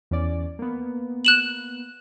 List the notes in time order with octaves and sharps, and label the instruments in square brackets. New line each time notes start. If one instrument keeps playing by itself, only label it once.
[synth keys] E2 C#4 D5
A#3 B3
[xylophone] F#6 E7 F#7